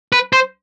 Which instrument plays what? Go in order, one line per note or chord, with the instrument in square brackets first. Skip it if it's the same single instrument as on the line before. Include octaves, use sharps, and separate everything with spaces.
[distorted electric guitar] B4
C5